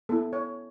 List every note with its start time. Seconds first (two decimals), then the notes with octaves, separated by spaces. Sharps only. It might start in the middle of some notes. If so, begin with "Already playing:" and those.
0.09 B3 E4 A4
0.33 C#5